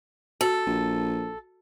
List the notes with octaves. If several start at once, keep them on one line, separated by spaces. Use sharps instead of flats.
F#4 A4
A#1